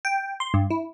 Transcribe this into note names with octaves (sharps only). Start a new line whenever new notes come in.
G5
C6
G2
E4